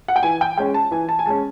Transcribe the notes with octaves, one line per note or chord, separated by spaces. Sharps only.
F#5
G5
E3 G#5
G5
G#3 C#4 G5
A5
E3 G#5
A5
G#5
G#3 C#4 A5